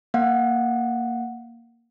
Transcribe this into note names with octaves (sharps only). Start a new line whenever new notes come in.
A#3 F5 F#5